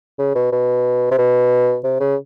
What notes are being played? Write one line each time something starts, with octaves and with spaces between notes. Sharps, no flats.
C#3
B2
B2
C3
B2
C3
C#3